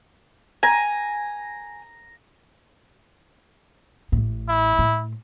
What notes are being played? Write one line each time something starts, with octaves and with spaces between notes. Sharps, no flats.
G#5 A#5
A1 A2
E4
A2